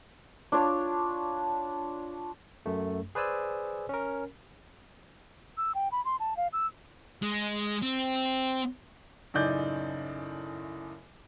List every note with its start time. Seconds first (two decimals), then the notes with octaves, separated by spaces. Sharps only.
0.52 D4 F4 C#5
2.66 F#2 A3
3.15 G#4 B4 C5 D5 G#5 E6
3.89 C#4 A#4
5.57 E6
5.75 G5
5.92 B5
6.05 C6
6.20 A5
6.37 F5
6.53 E6
7.23 G#3
7.83 C4
9.34 F#2 A2 C#3 D#4 D5 G6